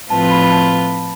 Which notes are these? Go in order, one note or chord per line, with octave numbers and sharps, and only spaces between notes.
A2 F3 C4 F4 B4 A5
B5
B5
A5